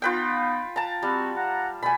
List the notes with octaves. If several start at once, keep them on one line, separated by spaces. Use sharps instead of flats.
B3 D#4 F4 B4 G5
A5 A#5
G3 C4 F#4
F#5 A#5
B2 A3 G#5 B5